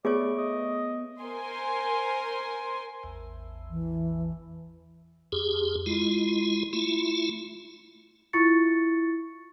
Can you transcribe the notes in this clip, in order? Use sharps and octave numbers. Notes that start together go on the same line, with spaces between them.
A3 B3 G#4 C#5 D5 C#6 D7
D#5
A#4 C5 G#5 C6
A1 E2
E3
F2 G4 G#4
G#3 E4 F4
A3 E4 F4
E4 F4 C#6 A6 C#7